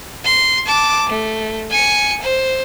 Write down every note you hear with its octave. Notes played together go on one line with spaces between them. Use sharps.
C6
A5 D6
A3
G#5 C#7
C5